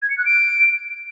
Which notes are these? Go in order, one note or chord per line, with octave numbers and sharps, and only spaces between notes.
G#6
C#7
F#6
D7